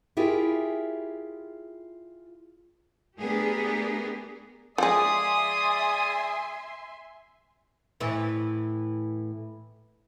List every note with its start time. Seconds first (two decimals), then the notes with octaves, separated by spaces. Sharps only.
0.17 E4 F4 G4 G#4 A#4
3.19 A3 B3 D4 G4 G#4 A#4
4.78 F3 G#3 G#4 D5 E5 G#5 C6 D#6
8.00 A2 E3